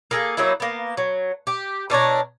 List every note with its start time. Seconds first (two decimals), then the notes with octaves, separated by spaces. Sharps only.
0.11 A#3 G#4 A4
0.37 F#3 A#3 D#4 E4
0.60 A#3 B3
0.97 F#3
1.47 G4
1.90 B2 D4 C#5 A#5